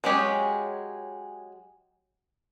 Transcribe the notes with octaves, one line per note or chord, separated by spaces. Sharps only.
F#3 G#3 C#4 G4 G#4